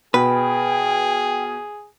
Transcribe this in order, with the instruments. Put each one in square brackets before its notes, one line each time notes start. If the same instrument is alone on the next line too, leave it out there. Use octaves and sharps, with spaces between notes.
[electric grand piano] B2 [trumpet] G#4 [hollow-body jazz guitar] B4 [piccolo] G5